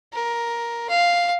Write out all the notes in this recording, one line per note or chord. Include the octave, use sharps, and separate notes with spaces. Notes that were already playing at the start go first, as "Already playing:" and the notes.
A#4
F5